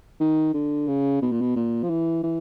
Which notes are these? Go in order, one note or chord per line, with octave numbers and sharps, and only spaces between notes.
D#3
D3
C#3
B2
A#2
B2
A#2
F3
E3
E3